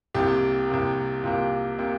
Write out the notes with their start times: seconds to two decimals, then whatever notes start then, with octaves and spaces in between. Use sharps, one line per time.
0.14 C2 C3 A#3 G4
0.69 C2 C3 A#3
1.23 C2 C3 A#3 F4
1.79 C3 A#3